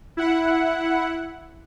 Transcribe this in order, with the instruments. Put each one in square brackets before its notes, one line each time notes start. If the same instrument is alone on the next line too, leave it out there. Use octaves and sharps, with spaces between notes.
[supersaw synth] E4 F#5